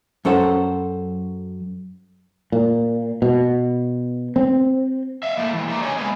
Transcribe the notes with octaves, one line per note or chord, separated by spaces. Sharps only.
F#2 C#4 A4 C5 F#5
A#2
B2
C4
E5 F5
A2 A3 A#3
E3 G3
A3 A#3 D#4 G4
D4 G4 C#5 D#5 G#5
G#3 A#3 B3